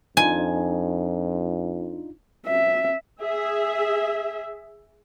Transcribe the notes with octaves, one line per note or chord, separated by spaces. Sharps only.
F2 D4 D#4 F4 G#5
E5
G#4 E5